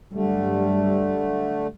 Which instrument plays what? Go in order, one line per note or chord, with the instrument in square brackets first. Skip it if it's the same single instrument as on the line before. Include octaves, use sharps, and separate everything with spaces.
[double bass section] G2 F#3 G3 [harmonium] D3 A3